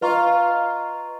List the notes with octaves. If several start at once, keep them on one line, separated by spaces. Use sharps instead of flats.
F4 B4 D#5 A#5 C#6